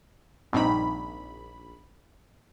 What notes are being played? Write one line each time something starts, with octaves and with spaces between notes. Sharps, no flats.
A#1 G2 C4 D#4 B5